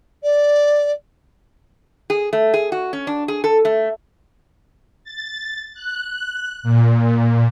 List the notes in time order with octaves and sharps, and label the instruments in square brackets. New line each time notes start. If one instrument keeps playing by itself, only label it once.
[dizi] D5
[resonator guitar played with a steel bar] G#4
A3
G#4
F#4
C#4
D4
G#4
A4
A3
[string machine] A6
F#6
A#2